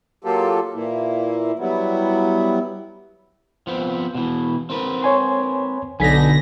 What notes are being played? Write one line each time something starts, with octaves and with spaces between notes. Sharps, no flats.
F#3 A#3 F4 G4 A4
A#2 E3 A#3 E4
F#3 G3 B3 E4
F3 B3 C4
B2 E3
C4 A#4 B4
C#5 G#5 C6
B1 D3 B3 D#4 G#5 A#6 B6